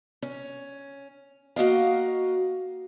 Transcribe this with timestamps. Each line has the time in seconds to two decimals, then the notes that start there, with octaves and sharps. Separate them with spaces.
0.22 C#4
1.56 A#3 F#4 D#5 F5